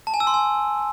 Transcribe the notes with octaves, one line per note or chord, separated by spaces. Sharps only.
A5
G#5
E6
C6
G#5